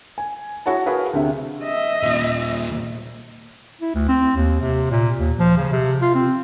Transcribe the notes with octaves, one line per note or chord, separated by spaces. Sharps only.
G#5
E4 F#4 G#4 C#5 F#5 A5
F#4 G#4 A#4 B4 F5
D2 C3
D#5 E5
D#2 A#2
E4
D2
C4
D#2
C3
A#2
D#2
F3
C#3
C3
F4
C4